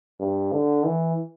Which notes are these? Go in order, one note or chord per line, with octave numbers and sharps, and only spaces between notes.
G2
D3
E3